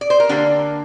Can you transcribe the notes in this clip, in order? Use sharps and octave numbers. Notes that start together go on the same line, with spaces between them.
D5
C5
A#4
D3 A#3 D4 G4